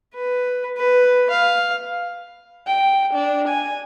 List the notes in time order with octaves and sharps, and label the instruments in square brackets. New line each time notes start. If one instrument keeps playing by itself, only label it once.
[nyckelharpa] B4
B4
F5
[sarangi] G5
D4
G#5